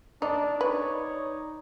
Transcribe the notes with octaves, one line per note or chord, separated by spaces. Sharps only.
D4 D#4 D5
D#4 B4 C#5